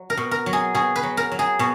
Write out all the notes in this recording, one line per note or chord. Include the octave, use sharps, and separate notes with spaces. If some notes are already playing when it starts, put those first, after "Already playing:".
Already playing: F#3
A#4
B2
A#4
F#3
G#4
B2 G#4
B4
F#3
A#4
F#3
G#4
B2